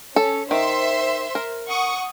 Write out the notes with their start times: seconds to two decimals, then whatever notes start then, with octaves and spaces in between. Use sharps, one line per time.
0.16 C#4 A4
0.51 D#3 C5 E5 C6
1.35 A#4
1.68 F#5 C#6 D#6